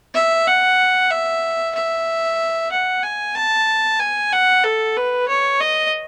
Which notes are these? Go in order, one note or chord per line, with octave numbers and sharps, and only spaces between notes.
E5
F#5
E5
E5
F#5
G#5
A5
G#5
F#5
A4
B4
C#5
D#5